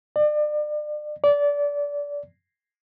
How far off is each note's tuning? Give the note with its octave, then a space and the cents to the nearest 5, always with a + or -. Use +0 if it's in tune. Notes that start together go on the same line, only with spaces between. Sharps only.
D5 +35
D5 -25